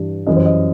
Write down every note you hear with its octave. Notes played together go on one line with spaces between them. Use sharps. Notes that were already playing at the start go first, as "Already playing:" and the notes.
Already playing: G2 E3 G3
F#2 E3 G3 D#5
C5
D#5